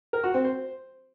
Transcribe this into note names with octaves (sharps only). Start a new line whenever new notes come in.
A#4
F#4
C4
C5